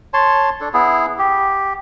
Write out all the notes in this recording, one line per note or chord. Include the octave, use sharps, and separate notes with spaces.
C#5 A5 C6
D4 A4
B3 E4 G#4
G4